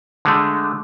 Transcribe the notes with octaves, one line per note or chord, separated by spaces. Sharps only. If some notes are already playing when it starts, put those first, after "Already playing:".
D3 G#3 A3